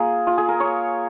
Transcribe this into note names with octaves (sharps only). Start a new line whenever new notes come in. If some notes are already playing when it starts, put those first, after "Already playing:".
Already playing: A#3 F4 G#4
F4
G#4
A#4
C#5